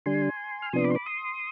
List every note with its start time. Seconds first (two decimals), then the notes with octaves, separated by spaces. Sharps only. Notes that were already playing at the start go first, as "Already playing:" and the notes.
0.06 D3 G3 D4 G#5 C6
0.62 F6
0.73 C3 F3 B3 D4 C6 D#6
0.84 B5 D6
0.90 C6
0.95 B5 D6
1.06 C6 D#6